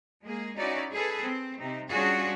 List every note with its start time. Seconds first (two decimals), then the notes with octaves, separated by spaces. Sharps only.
0.23 G#3 A#3 G#4
0.57 C#4 D#4 E4 F#4 D5
0.91 G#4 A4 B4
1.21 C4
1.58 C3 D#4
1.89 G3 C#4 D4 F4 F#4 G#4